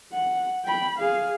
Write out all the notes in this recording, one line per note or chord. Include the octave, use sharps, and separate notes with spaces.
F#5
G5 B5
G#4 F5